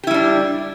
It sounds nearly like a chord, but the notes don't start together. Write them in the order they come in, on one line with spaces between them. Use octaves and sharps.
G4 E4 G3 D4